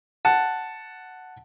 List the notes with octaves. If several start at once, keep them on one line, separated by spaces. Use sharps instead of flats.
F#5 A5